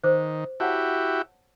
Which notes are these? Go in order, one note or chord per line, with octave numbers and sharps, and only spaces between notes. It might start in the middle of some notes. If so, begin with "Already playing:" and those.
D#3 C5 D6
E4 F#4 G4 C#5 F#5 A5